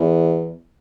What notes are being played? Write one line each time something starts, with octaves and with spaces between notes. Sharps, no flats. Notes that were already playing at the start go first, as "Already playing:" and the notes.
Already playing: E2